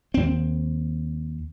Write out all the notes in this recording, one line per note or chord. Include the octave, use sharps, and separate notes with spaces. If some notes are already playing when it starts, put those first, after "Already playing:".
D#2 C4